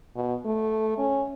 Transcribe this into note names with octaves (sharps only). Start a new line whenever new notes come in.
B2
A3
C#4